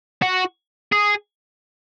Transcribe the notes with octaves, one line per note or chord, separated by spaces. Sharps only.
F#4
G#4